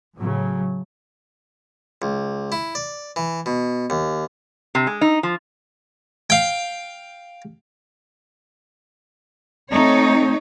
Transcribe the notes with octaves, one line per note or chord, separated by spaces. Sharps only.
A2 C#3 F#3
C#2
E4
D5
E3
B2
D#2
C3
G#3
D#4
F3
F5 G5
A3 C4 D#4 C#5